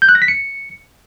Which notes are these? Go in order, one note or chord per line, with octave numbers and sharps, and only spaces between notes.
G6
F#6
A#6
B6
C#7